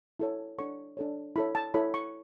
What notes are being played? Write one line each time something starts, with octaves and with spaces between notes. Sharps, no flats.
E4 A4 C#5
D4 A4 C#5 C#6
D4 A4 C#5
E4 A4 C#5 B5
A5
E4 A4 C#5 B5
C#6